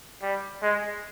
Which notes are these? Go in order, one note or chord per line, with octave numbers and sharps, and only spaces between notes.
G3
G#3